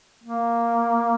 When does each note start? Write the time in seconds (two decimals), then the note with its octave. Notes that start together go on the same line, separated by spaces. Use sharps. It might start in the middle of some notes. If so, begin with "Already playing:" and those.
0.24 A#3